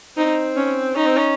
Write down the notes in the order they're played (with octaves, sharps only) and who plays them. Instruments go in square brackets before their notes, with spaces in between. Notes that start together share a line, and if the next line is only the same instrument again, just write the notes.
[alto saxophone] C4 [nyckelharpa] D#4
[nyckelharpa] C#4
[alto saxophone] C#4 [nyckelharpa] D#4
[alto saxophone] C4
C#4